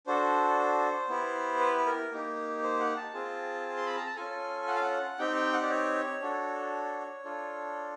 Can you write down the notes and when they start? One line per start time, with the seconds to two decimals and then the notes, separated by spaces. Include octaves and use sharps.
0.07 D4 F#4 A4 C5
1.09 B3 E4 G4
1.60 B4
1.79 B4
1.86 A#4
2.12 A#3 D#4 G4
2.63 C5
2.80 F#5
2.97 A5
3.14 C4 F4 G#4
3.77 C6
3.86 B5
3.97 A#5
4.06 A5
4.16 C#4 F4 A4 G#5
4.68 F#5
4.75 F5
4.82 F#5
5.19 C4 D#4 G4 G5
5.36 G5
5.53 F#5
5.63 D5
5.70 C#5
6.21 D4 F#4 A4
7.24 D4 F4 A4